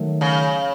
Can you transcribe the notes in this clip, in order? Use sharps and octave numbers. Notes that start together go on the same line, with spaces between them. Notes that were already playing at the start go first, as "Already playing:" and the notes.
Already playing: D#3 F#3 A3
C#3